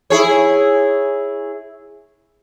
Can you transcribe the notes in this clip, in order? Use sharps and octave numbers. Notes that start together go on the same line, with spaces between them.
E4 G#4 C#5